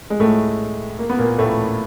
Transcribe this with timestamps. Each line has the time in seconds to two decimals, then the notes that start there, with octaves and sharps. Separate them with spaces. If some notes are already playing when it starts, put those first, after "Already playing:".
0.10 G#3
0.20 A2 A3
0.99 A#3
1.10 B3
1.19 A#2 A#3
1.38 A2 A3